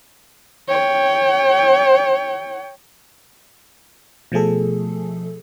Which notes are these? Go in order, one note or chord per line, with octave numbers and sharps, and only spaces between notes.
C#5 G5
B2 F3 A3 G#4 A4